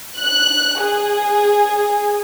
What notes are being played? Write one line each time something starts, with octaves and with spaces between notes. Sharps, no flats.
F#6
G#4